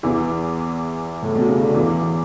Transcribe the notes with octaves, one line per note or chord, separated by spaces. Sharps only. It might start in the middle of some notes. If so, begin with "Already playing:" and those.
E2 E3
A2
B2
C#3
D3
E2 E3